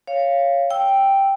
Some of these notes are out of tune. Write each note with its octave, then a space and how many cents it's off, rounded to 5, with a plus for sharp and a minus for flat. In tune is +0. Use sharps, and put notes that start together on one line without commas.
C#5 +0 F5 -10
G5 +0 E6 +0